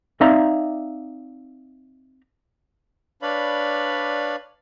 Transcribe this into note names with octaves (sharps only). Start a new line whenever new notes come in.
C4 D#4 D5 E5 F5 A#5
D4 B4 C#5 D5 F5 B5